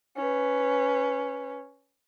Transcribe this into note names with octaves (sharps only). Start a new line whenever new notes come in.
C#4 B4